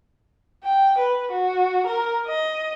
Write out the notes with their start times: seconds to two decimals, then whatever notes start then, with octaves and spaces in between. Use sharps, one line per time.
0.64 G5
0.98 B4
1.31 F#4
1.86 A#4
2.27 D#5